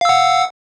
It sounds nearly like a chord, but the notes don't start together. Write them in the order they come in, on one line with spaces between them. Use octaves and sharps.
F5 E6 F#5